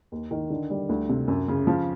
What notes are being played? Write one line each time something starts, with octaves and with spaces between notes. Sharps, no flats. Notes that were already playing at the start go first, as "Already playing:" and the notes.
D#2
D#3
D3
G3
D2
C3
F#2
C#3
F3